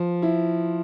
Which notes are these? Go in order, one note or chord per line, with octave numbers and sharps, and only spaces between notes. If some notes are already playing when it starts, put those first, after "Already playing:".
Already playing: F3
E4